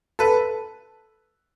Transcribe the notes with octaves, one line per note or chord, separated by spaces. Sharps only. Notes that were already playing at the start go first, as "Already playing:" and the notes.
A4 B4